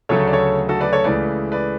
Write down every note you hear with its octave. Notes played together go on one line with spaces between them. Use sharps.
D2 C#3 F#3 A3 A4 C#5
D5
A4 C#5
F#4 A4
B4 D5
A4 C#5
C#2 C#3 E3 A3 B4 D5
B4 D5